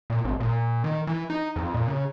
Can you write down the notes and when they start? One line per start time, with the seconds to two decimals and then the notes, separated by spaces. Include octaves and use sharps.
0.10 A#2
0.24 G#1
0.40 A#2
0.84 D#3
1.07 E3
1.30 D#4
1.56 F2
1.74 A#2
1.88 C#3